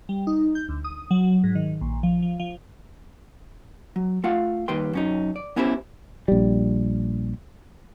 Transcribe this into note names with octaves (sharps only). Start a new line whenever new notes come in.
G3
D#4
G6
D2
D#6
F#3
G#2
D#3
A#1
F3
F3
F3
F#3
A3 F4 F5 F#5
D#2 D#3 G3 B4 G5 C6
F#2 C#4 D#4
D5
B3 C#4 E4 G4 A#4 C5
A#1 G3